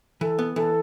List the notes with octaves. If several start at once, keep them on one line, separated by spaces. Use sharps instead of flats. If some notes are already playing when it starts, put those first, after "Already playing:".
E3 A4
B3
E3 A4